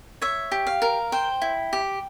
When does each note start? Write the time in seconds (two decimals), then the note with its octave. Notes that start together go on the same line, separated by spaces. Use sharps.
0.22 C#5 E5
0.52 G4
0.67 F5
0.82 A#4
1.12 C5 G5
1.42 E4
1.73 G4